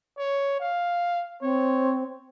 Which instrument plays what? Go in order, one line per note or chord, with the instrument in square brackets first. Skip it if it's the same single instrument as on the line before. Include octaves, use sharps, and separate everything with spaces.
[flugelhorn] C#5
F5
[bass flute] C4 [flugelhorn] C#5